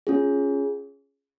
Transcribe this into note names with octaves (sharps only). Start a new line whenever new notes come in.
C#4 F4 G#4